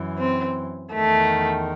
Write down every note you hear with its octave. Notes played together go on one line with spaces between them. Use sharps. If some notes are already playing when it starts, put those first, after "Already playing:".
Already playing: F#2 E3
C4
E2 D#3 A3